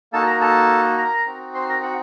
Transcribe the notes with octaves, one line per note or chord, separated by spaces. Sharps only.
A#3 D#4 F#4 A4 A5
A#4 A#5
A4 A5
A#4 A#5
C4 D#4 F#4
C5 C6
A#4 A#5
F#4 F#5